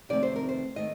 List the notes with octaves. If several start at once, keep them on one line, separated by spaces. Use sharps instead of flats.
F2 C3 D#3 A3 C4 D5
C5
A#4
C5
D#3 A3 D#5